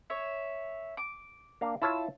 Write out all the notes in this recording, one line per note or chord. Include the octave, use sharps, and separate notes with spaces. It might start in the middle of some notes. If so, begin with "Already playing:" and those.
C#5 E5
D6
A#3 D4 F5
E4 F4 C#5 A5 E6